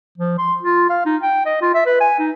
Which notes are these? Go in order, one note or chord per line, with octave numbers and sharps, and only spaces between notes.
F3
C6
F4
F5
D#4
G5
D#5
F4
E5
B4
G#5
D#4